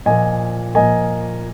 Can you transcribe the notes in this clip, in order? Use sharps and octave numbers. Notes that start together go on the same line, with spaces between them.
A#2 F3 A#3 D#5 G#5
A#2 F3 A#3 D#5 G#5